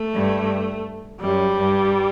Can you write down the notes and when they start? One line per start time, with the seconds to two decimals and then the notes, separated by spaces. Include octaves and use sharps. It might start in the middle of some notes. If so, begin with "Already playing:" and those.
Already playing: A3
0.14 G2
1.20 F#2 G3
1.56 G2